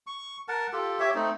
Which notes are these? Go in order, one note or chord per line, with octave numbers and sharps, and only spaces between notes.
C#6
A#4 F#5 A5
F4 G4 A4
G4 C#5 E5
A3 C4 D#4